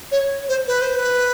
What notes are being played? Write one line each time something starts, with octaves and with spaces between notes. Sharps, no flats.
C#5
C5
B4
C5
B4